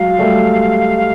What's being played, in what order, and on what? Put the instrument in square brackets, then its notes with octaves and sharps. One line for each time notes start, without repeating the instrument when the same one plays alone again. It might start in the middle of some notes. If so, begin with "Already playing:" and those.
Already playing: [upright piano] F#3 G#3 [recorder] F5
[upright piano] G3 A3